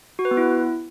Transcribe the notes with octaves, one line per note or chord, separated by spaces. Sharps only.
F#4
B4
B3
E4